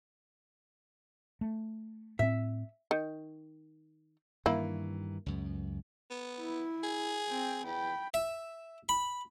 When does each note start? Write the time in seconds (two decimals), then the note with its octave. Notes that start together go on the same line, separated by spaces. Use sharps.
1.41 A3
2.19 A2 C4 E5
2.91 D#3
4.46 G2 D#3 E3 A#3 E4
5.26 C#2 F#2
6.11 B3
6.41 E4
6.83 G#4
7.29 C4 G5
7.65 E2 G5 B5
8.14 E5
8.89 B5